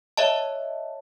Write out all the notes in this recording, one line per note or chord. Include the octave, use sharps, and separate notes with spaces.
C#5 D#5 E5 A5